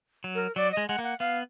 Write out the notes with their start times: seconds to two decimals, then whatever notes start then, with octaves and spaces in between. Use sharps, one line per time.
0.24 F#3
0.35 A#4
0.56 F#3 D5
0.72 D#5
0.77 G#3
0.88 G#3 F#5
0.99 A#3 F#5
1.19 B3 F5